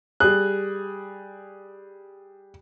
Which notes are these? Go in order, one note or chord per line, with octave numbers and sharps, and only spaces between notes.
G3 G#4 F#6